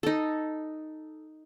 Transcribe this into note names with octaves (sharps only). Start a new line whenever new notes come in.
D#4 A4